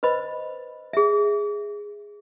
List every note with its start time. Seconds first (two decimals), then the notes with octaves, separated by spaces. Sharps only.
0.03 B4 C5 D#5 B5
0.93 G#4 E5